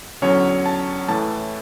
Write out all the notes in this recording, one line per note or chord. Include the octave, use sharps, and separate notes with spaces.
E2 D3 F#3 C#4 C#5
A5
A2 E3 A3 A5